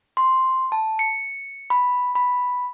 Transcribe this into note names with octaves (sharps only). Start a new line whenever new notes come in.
C6
A5
C#7
B5
B5